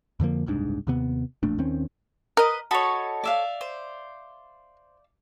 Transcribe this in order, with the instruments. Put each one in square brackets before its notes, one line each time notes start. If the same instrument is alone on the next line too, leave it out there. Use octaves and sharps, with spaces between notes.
[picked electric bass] F2 D3 F3 A#3
F#1 C2 G#2 D4
D#2 C3 B3
E1 A#1 A3 D4
D#2 D#3 C4 C#4
[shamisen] A#4 [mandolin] B4 D#5
[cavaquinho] F#4 D#5 B5 [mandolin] A4 C#5
[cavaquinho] D5 E5 F5
[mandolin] C5